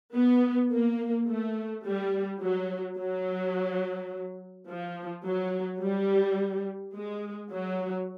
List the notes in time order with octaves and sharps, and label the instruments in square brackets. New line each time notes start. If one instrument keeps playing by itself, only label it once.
[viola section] B3
A#3
A3
G3
F#3
F#3
F3
F#3
G3
G#3
F#3